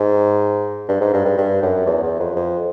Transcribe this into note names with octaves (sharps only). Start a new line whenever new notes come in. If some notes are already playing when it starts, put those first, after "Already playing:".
Already playing: G#2
G2
G#2
G2
G2
G2
F#2
E2
E2
F2
F2